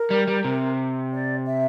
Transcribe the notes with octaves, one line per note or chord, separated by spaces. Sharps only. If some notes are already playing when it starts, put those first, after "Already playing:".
Already playing: A#4
G3
G3
C3
D5
E5